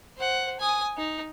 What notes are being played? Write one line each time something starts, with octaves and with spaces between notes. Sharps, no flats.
C5 F#5
G#5 D#6
D#4